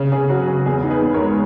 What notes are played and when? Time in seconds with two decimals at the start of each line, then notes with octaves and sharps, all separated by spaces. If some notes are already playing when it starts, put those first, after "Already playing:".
Already playing: C#3
0.12 C#3 G#4
0.29 F#3 F#4
0.48 C#3 G#4
0.66 E2 G#4
0.83 D#4
0.90 G#4 B4
1.02 E2
1.14 A#4 C#5
1.20 G#3